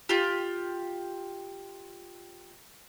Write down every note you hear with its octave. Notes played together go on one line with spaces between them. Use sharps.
F4 G4